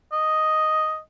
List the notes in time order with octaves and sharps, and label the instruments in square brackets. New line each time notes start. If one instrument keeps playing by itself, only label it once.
[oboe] D#5